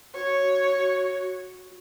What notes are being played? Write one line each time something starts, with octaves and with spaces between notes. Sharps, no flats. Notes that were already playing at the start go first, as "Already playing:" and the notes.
F#4 C#5